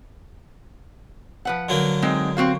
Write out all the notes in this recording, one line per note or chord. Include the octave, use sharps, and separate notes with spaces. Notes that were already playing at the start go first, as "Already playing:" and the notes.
F3 B4 F#5
D3 F#3 A#3
G#3 C4 D#4
C4 F#4 F5